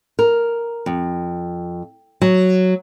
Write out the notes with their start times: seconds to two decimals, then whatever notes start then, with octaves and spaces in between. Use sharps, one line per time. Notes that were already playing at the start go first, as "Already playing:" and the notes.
0.19 A#4
0.86 F2
2.21 F#3